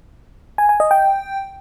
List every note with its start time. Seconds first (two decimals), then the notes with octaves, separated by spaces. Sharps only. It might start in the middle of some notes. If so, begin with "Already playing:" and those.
0.58 G#5
0.69 G#5
0.80 D#5
0.91 G5